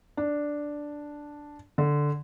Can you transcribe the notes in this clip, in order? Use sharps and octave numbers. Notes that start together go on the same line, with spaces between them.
D4
D3